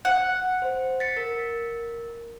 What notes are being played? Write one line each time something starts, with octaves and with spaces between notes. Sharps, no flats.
F#5
C5
A6 B6 C#7
A#4